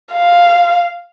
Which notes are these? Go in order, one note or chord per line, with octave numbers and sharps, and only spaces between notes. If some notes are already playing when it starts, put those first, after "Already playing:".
F5